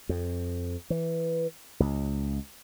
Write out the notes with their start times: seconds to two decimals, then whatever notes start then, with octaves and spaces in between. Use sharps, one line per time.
0.09 F2
0.90 E3
1.80 C#2